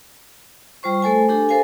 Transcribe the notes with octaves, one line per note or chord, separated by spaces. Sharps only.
G3 F4 C5 C#6
A3 A4 C5 G#5
D4 G4 A4 G#5
A4 A#4 C5 F5 G#5